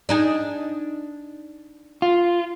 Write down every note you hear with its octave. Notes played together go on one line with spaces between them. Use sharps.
D4 D#4 G#4
F4